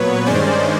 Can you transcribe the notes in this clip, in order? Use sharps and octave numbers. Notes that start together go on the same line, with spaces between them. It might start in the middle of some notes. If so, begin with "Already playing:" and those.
Already playing: A#2 F#3 B3 B4 C#5
G2 D#3 G#3 C#4 C5 D5